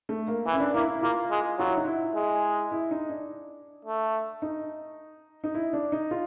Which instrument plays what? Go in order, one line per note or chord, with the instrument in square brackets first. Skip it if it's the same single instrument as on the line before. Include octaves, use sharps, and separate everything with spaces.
[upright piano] A3
A#3
[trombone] E3
[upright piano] C#4
D4
[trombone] A#3 [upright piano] E4
[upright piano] E4
[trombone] A#3 [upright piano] F4
[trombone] G#3
[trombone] F#3 [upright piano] F4
[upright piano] E4
D#4
E4
[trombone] G#3
[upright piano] E4
D#4
D4
[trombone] A3
[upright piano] D#4
D#4
E4
D4
D#4
F4